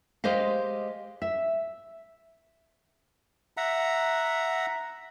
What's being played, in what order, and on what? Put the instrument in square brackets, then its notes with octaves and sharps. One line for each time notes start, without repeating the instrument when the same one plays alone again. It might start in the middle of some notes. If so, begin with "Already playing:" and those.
[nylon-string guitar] G#3 G4 C5 D#5 F5
E5
[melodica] E5 F#5 A#5